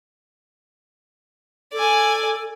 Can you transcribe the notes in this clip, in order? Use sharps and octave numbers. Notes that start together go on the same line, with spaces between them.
A4 D5 G#5